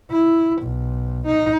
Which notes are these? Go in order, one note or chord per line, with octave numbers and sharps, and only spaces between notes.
E4
B1
D#4